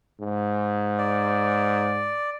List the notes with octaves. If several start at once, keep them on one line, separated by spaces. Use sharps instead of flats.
G#2
D5